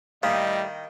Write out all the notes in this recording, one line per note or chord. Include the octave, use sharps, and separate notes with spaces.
A2 D#3 G3 D#5 F5